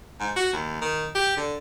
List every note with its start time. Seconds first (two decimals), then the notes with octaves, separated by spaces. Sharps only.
0.20 G#2
0.36 F#4
0.53 D#2
0.81 D#3
1.15 G4
1.37 D3